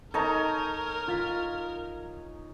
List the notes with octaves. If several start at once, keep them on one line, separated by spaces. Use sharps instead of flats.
D#4 A4 A#4 C#5 G#5 A#5
F4 A6 B6